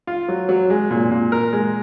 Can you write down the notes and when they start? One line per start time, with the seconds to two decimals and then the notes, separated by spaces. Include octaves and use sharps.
0.07 F4
0.28 F#3
0.49 F#3
0.70 G#3
0.91 A#2
1.11 A#2
1.32 A#4
1.53 G#3